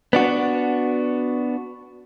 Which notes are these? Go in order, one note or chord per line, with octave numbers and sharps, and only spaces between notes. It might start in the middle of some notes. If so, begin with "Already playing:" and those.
B3 D4 F#4